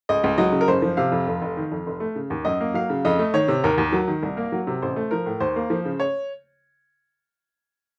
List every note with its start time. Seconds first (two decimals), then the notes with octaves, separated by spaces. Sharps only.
0.09 C#2 D#5
0.24 C#2
0.38 F#3 D#5
0.52 C#3
0.61 A#4
0.68 F#1 C5
0.82 F3
0.97 C3 F5
1.12 F2
1.27 F1
1.42 F1
1.57 D#3
1.71 F2
1.86 F1
2.00 A3
2.15 C#3
2.30 D#2
2.45 F#2 D#5
2.61 A#3
2.74 F#3 F5
2.90 C#3
3.05 F2 D#5
3.19 A3
3.34 D#3 C#5
3.48 C3
3.64 D#2 A#4
3.78 D#2
3.92 F#3
4.08 D#3
4.23 C2
4.37 A#3
4.52 F#3
4.67 C3
4.82 A1 C5
4.96 A3
5.11 F3 A#4
5.26 A2
5.40 D#2 C5
5.56 A#3
5.70 F3
5.85 C#3
6.00 C#5